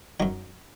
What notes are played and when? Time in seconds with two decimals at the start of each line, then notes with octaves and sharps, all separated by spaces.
0.20 F#2 F#3 D#4